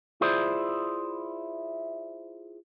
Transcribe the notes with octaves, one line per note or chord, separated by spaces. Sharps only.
E4 F4 G#4 C5 D5